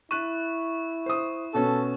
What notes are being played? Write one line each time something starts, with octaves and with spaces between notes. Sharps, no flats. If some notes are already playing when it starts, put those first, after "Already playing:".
E4 C#6 F#6 D#7
C5 D#6
B2 B3 C#4 A4